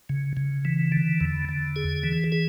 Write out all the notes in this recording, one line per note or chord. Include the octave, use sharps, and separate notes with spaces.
C#3
C#3
E3
D3
E2
D3
G#4
E3
G#4